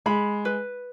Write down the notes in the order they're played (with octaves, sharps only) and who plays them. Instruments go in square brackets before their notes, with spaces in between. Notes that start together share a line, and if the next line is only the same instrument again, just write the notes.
[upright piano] G#3 [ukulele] B5
[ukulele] B4